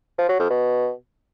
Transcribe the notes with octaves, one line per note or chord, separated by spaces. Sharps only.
F3
F#3
F2
B2